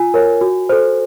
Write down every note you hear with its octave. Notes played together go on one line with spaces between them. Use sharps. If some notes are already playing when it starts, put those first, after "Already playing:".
Already playing: F4 G#5
A#4 C#5
F#4
A4 C5